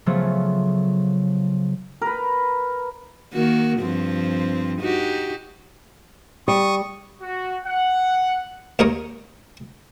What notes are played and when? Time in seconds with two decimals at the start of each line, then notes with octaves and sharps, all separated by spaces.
0.06 C#3 F3 F#3 A3 B3
2.02 A#4 B4
3.33 D#3 A#3 F#4
3.79 G2 F3 C4
4.80 D#4 F#4 G4
6.48 G3 C#6 D#6
7.22 F#4
7.66 F#5
8.79 D#2 D#4 A#4 C#5 D#6